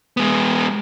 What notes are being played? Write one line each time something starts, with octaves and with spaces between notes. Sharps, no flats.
G#3 B3